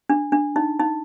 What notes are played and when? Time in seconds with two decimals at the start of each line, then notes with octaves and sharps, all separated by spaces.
0.09 D4
0.32 D4
0.56 D#4
0.80 D#4